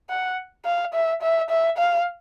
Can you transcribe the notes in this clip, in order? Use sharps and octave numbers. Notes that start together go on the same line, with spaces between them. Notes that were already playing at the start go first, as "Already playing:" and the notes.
F#5
F5
E5
E5
E5
F5